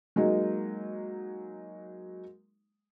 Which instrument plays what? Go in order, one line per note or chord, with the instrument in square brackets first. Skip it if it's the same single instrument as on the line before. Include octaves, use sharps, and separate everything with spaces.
[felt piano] F#3 G#3 A#3 D#4